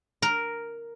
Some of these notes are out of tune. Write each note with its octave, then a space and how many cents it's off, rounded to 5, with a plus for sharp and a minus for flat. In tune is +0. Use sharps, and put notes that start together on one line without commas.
A#4 +0